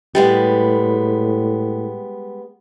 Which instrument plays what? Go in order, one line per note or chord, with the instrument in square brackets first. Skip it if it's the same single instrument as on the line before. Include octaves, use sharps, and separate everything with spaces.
[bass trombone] A2 [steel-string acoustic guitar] G3 G#3 B3